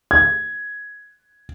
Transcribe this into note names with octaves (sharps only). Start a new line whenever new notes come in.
G#6